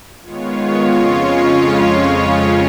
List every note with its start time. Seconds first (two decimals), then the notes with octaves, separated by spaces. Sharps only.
0.22 D#3 G#3 B3 F4 C#5
0.88 F2 C#3 G#3 C#4 F4 C#5